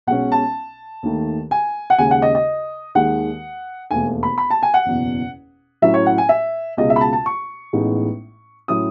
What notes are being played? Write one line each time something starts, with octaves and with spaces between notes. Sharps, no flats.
B1 B2 G#3 C#4 F#5
A5
D#2 D#3 A3
G#5
F#5
D#2 C#3 G#3 G#5
F#5
D#5
D#5
D#2 D#3 G#3 F#5
E1 D#2 D#3 A3 G#5
B5
B5
A5
G#5
F#5
F#1 E2 B2
A2 F#3 C#4 E4 E5
C#5
F#5
G#5
E5
C#2 B2 G#3 D#5
E5
B5
A5
A5
C#6
A1 A2 G#3 B3 D#4
A2 F#3 C#4 E4 D#6